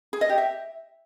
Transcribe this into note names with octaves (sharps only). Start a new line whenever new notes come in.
G#4
D#5
G4
E5